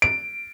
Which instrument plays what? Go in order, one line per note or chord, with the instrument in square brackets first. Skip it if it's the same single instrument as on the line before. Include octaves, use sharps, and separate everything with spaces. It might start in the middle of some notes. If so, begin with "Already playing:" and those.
[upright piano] D7